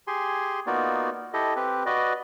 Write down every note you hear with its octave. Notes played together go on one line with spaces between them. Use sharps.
G4 G#4 G#5 C6
A#3 B3 D#4 F4 F#4 D5
E4 G4 A4 D#5
C4 G4 B4
F#4 B4 D5 D#5